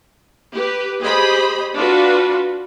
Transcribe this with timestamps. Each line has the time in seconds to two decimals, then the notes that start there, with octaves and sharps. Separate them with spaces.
0.53 G4 B4
1.01 G4 G#4 C5 D#5 B5
1.75 D4 F4 F#4 B4